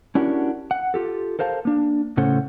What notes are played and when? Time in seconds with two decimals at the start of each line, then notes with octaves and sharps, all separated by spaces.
0.15 C#4 D4 E4 F#4 G4 A#4
0.71 F#5
0.94 F4 G4 A4
1.39 A4 A#4 C5 F5 A5
1.65 A#3 D4
2.17 A2 C#3 C#4 A4 C5 F#5